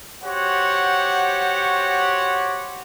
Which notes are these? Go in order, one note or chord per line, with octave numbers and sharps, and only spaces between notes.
F#4 G4 C5 C#5 F#5